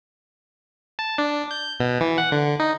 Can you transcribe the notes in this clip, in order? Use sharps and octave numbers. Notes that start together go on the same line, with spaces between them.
A5
D4
G6
B2
E3
F#5
D3
D#4